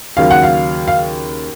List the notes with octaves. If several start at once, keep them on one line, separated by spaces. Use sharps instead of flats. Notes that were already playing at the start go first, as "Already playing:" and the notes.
D#2 C#3 F#3 F5
F#5
F5
F5